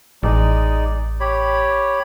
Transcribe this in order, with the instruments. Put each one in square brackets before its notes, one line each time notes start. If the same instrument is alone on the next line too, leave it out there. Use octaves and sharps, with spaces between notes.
[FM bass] A1 [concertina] G#3 D#4 D5
[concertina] G4 C#5 B5